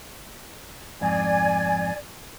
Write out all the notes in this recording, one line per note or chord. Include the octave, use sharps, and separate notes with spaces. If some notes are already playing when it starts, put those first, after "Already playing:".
F2 G#2 D5 G#5 G#6